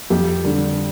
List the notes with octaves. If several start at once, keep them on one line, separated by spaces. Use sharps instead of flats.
F2 G4
D3 G3